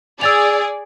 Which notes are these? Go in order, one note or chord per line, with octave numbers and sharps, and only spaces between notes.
G#4 D5 E6 A6 F7